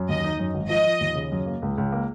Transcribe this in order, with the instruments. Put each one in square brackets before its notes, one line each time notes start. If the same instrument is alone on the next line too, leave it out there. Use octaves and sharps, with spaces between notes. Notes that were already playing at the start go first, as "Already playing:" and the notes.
Already playing: [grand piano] F#2
[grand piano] D#2 [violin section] D#5
[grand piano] D#4
F#2
G#1
[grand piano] F3 [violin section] D#5
[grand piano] F3
D#2
C#3
F#2
A#3
C#2
C#2
A#3